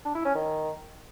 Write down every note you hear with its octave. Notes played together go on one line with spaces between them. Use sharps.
D4
E4
C#4
D#3